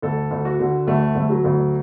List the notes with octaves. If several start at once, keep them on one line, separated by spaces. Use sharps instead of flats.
D2 A4
D2
F#4
D3
D2 A3
D2 A3
F#3
D2